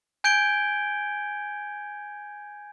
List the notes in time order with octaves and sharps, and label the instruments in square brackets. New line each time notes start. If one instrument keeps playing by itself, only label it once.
[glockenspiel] G#5 G6 G#6 D7 G7